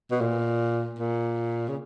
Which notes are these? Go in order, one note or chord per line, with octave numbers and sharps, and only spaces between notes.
B2
A#2
A#2
C#3